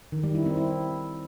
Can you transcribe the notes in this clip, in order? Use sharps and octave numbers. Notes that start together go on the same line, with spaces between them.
D#3
G3
E4
C4
E4